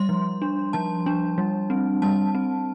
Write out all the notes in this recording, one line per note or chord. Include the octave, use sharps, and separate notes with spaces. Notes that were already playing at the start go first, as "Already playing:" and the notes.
Already playing: G3 C6
F3
D4
F3 A5
D4
G3
C4
G3 A5
C4